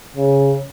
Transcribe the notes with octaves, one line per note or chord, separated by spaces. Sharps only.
C#3